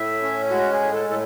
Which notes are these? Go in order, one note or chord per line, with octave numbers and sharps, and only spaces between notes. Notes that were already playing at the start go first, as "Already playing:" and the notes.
Already playing: A2 E5
C#4
G#3 F#4
G#4
A2
A4
A2 A4